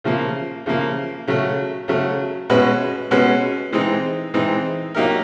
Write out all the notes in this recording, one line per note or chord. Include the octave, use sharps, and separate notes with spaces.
C#3 F3 A#3
C#3 F3 A#3
C#3 F#3 A3
C#3 F#3 A3
B2 G#3 C#4 F#4 B4
B2 G#3 C#4 F#4 B4
E3 G#3 C4 D#4
E3 G#3 C4 D#4
F#3 A#3 D#4 G4 A#4